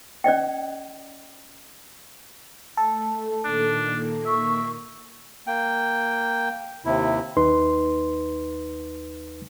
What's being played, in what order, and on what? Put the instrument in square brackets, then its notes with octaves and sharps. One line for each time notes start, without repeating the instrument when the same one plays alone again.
[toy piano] C#4 D5 D#5 G5
[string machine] A3 [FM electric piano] A4
[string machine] A#2 D#3 A#3 [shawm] D4
[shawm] E5 [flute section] C#6
[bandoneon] A#3 G5
D#2 C3 E4
[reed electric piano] D#2 D#4 B4 C6